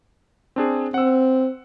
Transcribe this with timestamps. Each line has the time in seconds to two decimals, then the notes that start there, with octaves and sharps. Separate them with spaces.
0.56 C4 D4 G#4
0.94 C4 F#5 E6